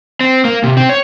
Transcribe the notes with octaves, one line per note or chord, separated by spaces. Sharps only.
C4
A#3
C3
C4
C#5